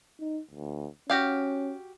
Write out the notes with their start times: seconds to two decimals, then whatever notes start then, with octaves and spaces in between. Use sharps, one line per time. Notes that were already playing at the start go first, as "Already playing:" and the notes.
0.20 D#4
0.51 D2
1.10 C#4 F#4 G4 F5